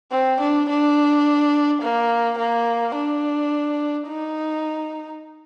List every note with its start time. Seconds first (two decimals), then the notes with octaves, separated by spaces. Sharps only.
0.12 C4
0.40 D4
0.69 D4
1.82 A#3
2.39 A#3
2.95 D4
4.08 D#4